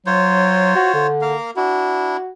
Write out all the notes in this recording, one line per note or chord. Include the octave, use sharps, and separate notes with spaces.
F#3 F4 C5 C#5
F#4
D3
A#3 A#4 F5
D4 E4 F#4